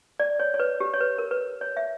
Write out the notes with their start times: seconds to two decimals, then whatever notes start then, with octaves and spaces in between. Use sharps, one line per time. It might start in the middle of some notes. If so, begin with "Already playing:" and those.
0.19 D5
0.39 C#5
0.54 C#5
0.60 B4
0.80 G4
0.94 C#5
1.00 B4
1.18 A#4
1.31 B4
1.61 C#5
1.77 E5